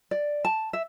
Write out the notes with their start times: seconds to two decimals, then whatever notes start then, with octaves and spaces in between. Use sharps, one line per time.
0.11 D5
0.45 A5
0.73 E5